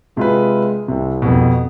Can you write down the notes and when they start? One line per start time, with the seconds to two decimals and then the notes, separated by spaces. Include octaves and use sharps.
0.17 C3 G#3 F4 B4
0.88 C2 C3
1.22 F2 B2